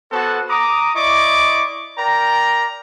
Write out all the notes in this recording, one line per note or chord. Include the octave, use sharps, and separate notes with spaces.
B3 F#4 A4 C5 F#5 A5
A#5 D6 D#6
E4 D5 D#5 C#6 D6
A#4 D5 G5 A#5